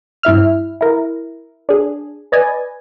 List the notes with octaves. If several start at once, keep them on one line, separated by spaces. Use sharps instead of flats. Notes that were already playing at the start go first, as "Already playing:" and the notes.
G2 E4 E5 F6
E4 A#4
D4 G#4
B4 D5 D#5 G#5